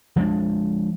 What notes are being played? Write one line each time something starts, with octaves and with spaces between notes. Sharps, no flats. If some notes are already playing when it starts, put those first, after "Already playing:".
F3 G#3 C#4 D4